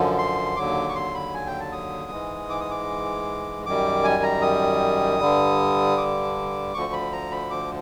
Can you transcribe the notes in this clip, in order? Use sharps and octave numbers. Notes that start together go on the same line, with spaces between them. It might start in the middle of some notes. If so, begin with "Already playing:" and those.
Already playing: F#2 D3 F3
C6
D#2 D3 F#3 D6
C#6
C6
B5
G#5
G5
A5
D#6
G#2 E3 G#3
D6
D#6
D6
F#2 D#3 G3 D6
G#5
A#5
D#6
G2 D3 G3
D6
D2 D3 F3 C#6
B5
A#5
B5
D6